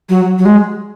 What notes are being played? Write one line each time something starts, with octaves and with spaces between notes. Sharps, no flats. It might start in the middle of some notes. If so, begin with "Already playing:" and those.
F#3
F#3
G#3